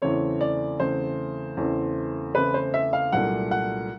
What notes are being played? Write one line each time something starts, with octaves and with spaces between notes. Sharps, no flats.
E2 C#3 E3 A3 C4 C#5
D5
E2 C#3 E3 A3 C4 C5
E2 C#3 E3 A3 C4
E2 C#3 E3 A3 C4 B4
C5
E5
F5
C2 A#2 F#3 A3 D4 F#5
F#5